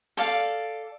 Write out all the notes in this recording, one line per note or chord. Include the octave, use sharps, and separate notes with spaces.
A4 D5 F5